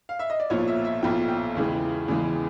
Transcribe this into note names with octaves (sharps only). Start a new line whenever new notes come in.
F5
E5
D#5
D5
B1 A#2 F3 C#5
E5
E5
B1 A#2 F3 G5
G5
E2 C#3 E3 G#3
E2 C#3 E3 G#3